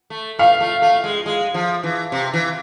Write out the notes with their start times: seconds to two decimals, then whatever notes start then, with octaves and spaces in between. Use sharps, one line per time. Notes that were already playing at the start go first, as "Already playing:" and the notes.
0.10 A3
0.39 A3 F5
0.60 A3
0.82 A3
1.04 G#3
1.26 G#3
1.54 F3
1.83 E3
2.12 C3
2.33 E3